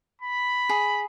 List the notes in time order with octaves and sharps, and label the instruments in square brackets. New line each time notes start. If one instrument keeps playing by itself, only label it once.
[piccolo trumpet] B5
[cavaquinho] G#4